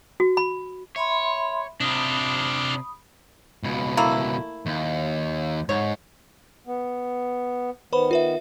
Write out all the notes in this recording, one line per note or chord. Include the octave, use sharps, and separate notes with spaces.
F#4
B5
C#5 E5 B5 C6
C3 D4 F4 B5 D#6
C#2 B2
A3 A#3 E4
D#2
G#2 C#5
B3
D#3 B3 B4 C5 B5
F4 B4 E5